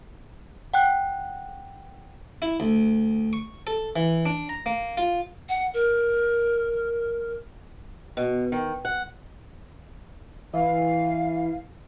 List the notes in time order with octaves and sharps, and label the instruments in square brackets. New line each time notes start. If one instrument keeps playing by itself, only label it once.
[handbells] F#5 G5 F#6
[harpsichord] E4
D2
C#6
A4
E3
D4
A#5
A#3
F4
[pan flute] F#5
A#4
[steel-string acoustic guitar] B2
D#3
F#5
[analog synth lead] E3 [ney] F5